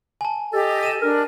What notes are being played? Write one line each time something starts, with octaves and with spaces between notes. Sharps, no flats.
G#5 A5
G4 A4 D#5
D#7 E7
D4 A#4